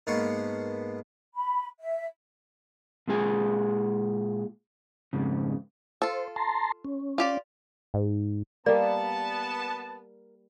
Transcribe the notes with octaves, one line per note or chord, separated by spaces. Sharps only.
G#2 A#3 B3 A#4 A5 C#6
B5
E5
A#2 G#3 F4 G#4 G#5
F2 G#2 C#3
F4 A4 C5
A5 A#5 C6
C#4
F4 G4 D5
G#2
G3 A#3 B3 A#4 D5 A5